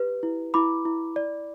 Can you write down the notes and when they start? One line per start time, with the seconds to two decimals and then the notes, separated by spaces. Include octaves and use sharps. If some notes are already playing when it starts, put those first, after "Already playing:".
Already playing: G4 B4
0.23 E4
0.54 E4 B5 D6
0.85 E4
1.16 D5